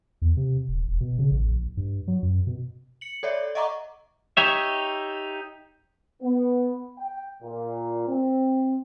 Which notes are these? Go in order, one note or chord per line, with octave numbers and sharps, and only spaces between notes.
E2
C3
D#1
E1
B2
C#3
A1
A#1
G2
F#3
F#2
B2
C#7 F#7
A4 C#5 D5 E5
D#5 E5 F#5 A#5 C#6 D6
D#4 G4 C#5 E5
B3
G5
A#2
C4